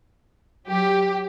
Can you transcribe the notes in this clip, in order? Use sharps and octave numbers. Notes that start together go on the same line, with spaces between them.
F#3 G4